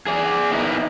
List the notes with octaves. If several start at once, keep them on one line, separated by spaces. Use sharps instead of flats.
G#4 D5
B3 D#4 E4 A#4